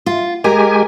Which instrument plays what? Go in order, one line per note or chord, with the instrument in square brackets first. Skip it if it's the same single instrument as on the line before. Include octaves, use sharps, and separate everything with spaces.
[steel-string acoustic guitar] F4
[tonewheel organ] G#3 G4 G#5 [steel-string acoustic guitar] A#4